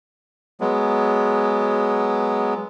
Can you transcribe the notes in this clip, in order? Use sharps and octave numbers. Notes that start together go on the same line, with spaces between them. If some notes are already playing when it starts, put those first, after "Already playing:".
F#3 G#3 B3